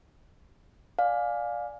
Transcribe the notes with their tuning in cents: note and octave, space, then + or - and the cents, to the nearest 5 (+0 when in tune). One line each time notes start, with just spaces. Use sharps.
D5 +0 F5 +20 G#5 +0